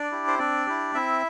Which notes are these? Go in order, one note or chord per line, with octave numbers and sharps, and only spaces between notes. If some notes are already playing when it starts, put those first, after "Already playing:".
Already playing: D4 D5
E4 G4
C5
C4 D4 D5
E4 G4
C4 E4 E5